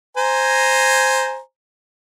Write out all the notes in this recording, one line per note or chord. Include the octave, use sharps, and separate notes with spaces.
C5 G#5 A#5